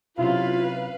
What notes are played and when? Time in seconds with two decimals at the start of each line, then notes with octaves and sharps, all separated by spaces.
0.18 C3 F#3 C#4 E4 F4 B4 F5